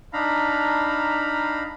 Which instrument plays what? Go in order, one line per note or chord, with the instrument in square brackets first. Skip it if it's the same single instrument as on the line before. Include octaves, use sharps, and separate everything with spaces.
[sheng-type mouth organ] D4 D#4 F5 A#5 B5